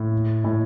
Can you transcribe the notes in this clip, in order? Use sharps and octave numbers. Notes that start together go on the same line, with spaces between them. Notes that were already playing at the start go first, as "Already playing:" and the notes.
Already playing: A2
A2